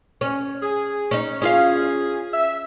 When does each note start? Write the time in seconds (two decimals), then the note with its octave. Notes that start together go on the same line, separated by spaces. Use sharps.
0.21 C#4
0.62 G#4
1.11 C#4 D#4
1.42 C#4 F4 G#4 F5
2.33 E5